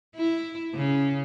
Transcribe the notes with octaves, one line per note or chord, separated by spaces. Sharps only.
E4
C#3